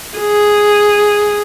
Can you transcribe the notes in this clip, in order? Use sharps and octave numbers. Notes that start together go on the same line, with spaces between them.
G#4